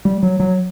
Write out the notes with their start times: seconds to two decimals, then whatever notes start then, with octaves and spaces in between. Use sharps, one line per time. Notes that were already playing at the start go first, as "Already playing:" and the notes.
0.05 G3
0.23 F#3
0.40 F#3